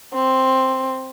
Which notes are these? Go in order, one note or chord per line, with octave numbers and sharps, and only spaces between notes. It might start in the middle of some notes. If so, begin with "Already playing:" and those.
C4